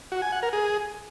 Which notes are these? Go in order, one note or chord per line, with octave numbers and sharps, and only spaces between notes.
F#4
G#5
F#5
A#4
G#4